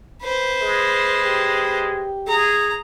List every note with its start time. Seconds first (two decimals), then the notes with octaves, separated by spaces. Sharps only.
0.22 B4 C5
0.62 G#3
1.22 G4
2.27 G#4 A#5